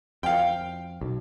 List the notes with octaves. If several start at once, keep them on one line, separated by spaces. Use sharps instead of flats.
F2 F5 G5
B1